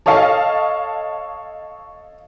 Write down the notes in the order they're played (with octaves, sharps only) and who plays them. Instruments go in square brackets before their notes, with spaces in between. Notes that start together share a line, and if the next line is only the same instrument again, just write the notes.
[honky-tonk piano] A4 C#5 D#5 F5 A5